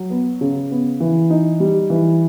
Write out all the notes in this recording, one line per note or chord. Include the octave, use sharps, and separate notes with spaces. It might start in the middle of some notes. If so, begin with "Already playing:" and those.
Already playing: F#3
B3
C#3
B3
E3
D#4
G3
E3